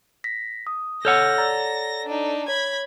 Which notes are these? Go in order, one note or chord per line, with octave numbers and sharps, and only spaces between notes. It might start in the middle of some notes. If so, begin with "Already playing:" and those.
A#6 B6
D#6
A4 C#5 F#5 E6 F6 G6 A#6
D5 A#5 A6
D4 D#4
C#5 B5 G#6